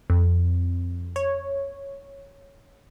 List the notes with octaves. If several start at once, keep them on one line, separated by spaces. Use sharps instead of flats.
F2
C#5